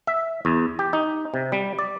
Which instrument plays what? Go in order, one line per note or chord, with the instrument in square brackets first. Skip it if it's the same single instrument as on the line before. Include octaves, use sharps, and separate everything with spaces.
[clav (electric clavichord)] E5
E2
G4
D#4
C3
G3
D5